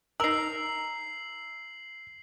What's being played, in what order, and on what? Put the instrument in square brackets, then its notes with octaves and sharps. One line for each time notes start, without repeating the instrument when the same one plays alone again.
[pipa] D#4 A#4 [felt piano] E6 [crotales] C7 F#7